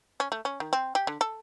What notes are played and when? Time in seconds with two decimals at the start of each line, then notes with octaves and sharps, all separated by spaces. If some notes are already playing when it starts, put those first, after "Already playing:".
0.20 C#4
0.32 A3
0.45 C#4
0.60 D#3
0.73 C4
0.95 G4
1.07 D3
1.21 A4